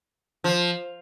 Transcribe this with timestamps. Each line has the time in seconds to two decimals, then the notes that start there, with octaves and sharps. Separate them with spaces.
0.44 F3